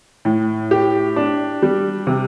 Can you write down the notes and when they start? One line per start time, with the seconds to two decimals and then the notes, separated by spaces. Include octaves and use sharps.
0.25 A2
0.71 G4
1.16 D4
1.62 G3
2.07 C3